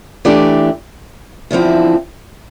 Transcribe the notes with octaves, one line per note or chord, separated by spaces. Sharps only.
E3 A3 D4 G4 D5
E2 D3 F3 C4 E4